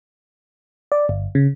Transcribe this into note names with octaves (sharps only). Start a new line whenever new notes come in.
D5
G1
C#3